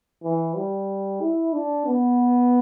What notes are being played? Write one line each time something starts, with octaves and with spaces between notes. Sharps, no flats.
E3
G3
E4
D4
B3